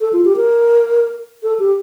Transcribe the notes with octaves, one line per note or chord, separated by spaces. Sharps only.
A4
F4
G4
A#4
A4
G4